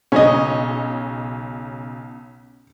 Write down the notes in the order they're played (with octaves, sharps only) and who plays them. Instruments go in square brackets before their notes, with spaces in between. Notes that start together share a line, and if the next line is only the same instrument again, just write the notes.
[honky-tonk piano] B1 C#3 [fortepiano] C#4 D#5